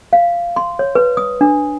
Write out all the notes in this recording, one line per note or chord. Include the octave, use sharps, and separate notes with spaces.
F5
C6
C#5
B4
D#6
D4